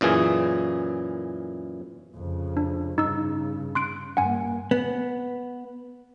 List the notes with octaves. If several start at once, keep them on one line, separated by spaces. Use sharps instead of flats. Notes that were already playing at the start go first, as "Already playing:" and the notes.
F#2 A#2 E3 G#4
F2 C#3
D4
G2 C#3 D#4 E6
C6 F#6 D7
G2 A#3 F#5 G#5
B3